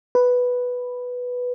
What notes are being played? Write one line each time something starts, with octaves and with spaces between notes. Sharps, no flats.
B4